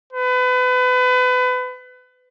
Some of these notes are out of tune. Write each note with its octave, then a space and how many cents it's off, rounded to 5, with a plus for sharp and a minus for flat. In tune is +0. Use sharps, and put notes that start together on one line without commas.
B4 +30